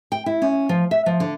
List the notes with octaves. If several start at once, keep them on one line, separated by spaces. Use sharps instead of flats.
G5
E4
C#4
F3
E5
F3
D3